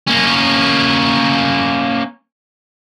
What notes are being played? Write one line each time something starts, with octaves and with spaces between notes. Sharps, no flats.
A#3 C#4